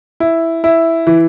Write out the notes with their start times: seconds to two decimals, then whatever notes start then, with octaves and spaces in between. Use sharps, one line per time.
0.20 E4
0.64 E4
1.07 E3